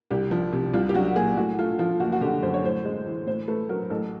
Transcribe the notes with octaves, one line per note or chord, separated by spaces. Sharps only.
C2 G4
F3
C3
C2 F4
G4
F#3 F#4
A#2 G#4
A2 F#4
A3 F4
F3 F4
F#1 F#4
F#4
D3 G4
F#2 C5
C#5
A2 C5
G#3
E3
A2 C5
A3 B4
F#3 A#4
A1 A4